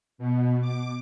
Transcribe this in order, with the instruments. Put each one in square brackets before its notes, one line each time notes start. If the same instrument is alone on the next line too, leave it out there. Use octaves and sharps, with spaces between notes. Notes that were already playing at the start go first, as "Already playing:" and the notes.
[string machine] B2
D6